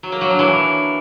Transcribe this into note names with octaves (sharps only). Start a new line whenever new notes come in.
F#3
A#3
F#3
D4
E3